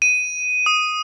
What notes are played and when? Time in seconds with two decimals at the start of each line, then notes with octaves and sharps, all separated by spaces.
0.02 D#7
0.66 D#6